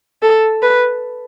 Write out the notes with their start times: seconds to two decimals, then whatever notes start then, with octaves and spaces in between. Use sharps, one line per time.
0.22 A4
0.62 B4